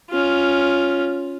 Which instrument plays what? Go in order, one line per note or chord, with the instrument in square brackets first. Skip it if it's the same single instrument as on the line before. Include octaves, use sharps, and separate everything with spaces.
[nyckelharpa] C#4 F4